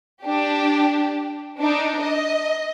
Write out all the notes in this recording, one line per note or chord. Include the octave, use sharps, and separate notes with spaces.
D4 G4
D4 D#4
D#5